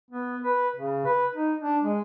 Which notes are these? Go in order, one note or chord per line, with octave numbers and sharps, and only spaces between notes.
B3
B4
C#3
B4
D#4
D4
G#3